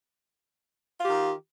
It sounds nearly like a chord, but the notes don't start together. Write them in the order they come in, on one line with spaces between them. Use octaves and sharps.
F4 G4 D#3